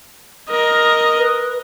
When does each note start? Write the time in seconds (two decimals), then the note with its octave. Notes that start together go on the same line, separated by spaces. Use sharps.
0.49 A#4 D#5
1.18 B4